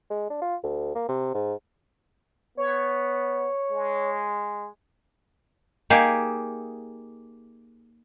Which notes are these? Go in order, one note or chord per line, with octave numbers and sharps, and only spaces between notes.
G#3
D4
F4
D2
A#3
C3
G#2
B3 C#5
G#3
A#3 D#4 G4 G#4